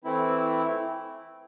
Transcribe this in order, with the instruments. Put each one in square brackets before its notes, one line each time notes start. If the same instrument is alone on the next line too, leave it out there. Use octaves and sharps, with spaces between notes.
[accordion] E3 A3 C4 E4